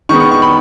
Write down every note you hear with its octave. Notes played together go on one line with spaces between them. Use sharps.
D#3 G#3 B3 C#6
C#6
C#6
B5